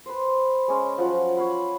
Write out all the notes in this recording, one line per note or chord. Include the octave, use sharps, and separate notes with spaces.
B4 C5
G#3 C#4
F3 F#3 F#5
C#5 F5 F#5 B5